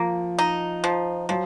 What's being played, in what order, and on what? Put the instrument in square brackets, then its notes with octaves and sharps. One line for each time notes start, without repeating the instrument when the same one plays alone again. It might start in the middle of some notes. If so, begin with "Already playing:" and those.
Already playing: [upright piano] F3 [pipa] A#3
[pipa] D#4
F3
[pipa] F3 [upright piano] F#3